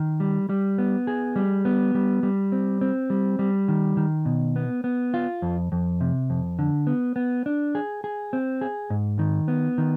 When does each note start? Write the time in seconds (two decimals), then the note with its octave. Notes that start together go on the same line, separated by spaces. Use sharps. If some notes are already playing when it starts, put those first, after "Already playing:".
Already playing: D#3
0.20 G3
0.49 G3
0.78 B3
1.07 G#4
1.36 G3
1.65 B3
1.95 G3
2.23 G3
2.52 C4
2.81 C4
3.10 G3
3.39 G3
3.68 D#3
3.97 D#3
4.26 B2
4.56 B3
4.84 B3
5.14 F4
5.42 F2
5.72 F2
6.01 C3
6.30 F2
6.59 D3
6.87 B3
7.16 B3
7.46 D4
7.75 G#4
8.04 G#4
8.33 C4
8.61 G#4
8.90 G#2
9.19 D#3
9.48 B3
9.78 D#3